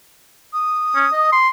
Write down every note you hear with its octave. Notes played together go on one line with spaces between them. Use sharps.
D#6
C#4
D#5
C6